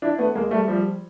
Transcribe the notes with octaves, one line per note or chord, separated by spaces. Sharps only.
D4 E4
A3 B3
G#3 A#3
G3 A3
F3 G3